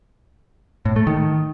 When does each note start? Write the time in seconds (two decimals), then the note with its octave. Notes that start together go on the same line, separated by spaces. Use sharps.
0.85 A2
0.96 A3
1.07 D#3